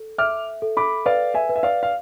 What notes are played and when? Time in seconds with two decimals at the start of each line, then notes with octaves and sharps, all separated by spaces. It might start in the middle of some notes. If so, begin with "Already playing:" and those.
Already playing: A4
0.18 E5 D6 F6
0.62 A4
0.77 B5 D6
1.06 B4 D5 F5
1.34 E5 G#5
1.49 B4
1.56 E5
1.63 D5 F5
1.83 F5